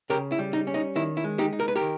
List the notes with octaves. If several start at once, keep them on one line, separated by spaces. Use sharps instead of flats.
C#3 G4 A#4
E4
G3
D#4
C#4
D#4
D#3 E4
E4
G#3
D#4 G4
D#4
A#4
B4
G4 A#4
D#3